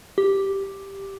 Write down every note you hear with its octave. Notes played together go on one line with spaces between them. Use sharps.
G4